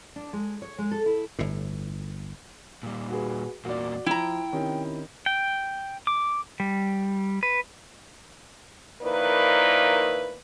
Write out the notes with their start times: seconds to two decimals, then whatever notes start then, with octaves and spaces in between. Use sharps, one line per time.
0.16 D4
0.33 G#3
0.62 C#5
0.78 G#3
0.91 A4
1.06 E4
1.39 G1 A2
2.83 A#2 G3
3.09 F#4 G#4 B4
3.65 E2 A#2 A#3 F#4 D5
4.06 F3 E4 G5 A#5
4.52 C3 D#3 C#4
5.26 G5
6.07 D6
6.60 G3
7.43 B4
9.02 D#3 F3 A#3 E4 B4 D5